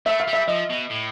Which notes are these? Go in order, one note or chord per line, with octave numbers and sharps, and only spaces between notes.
A3 E5
F5
G3
E5
F3 D#5
B2
A2